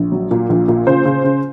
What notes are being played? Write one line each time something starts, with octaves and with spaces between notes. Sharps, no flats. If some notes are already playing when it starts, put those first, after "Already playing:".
Already playing: A#1
F#3
A#2
A#1
A#2
C#3 C5
C#3
C#3